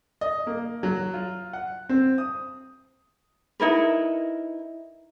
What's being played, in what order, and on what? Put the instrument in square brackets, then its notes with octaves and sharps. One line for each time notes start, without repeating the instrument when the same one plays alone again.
[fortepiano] D#5
A#3
F#3
F4
F#5
C4
D#6
[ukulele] D#4 E4 A#4 B4